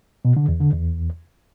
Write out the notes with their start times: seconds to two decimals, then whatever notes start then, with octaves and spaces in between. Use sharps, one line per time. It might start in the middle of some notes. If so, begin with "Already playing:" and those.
0.25 B2
0.37 D3
0.48 E2
0.60 D3
0.72 E2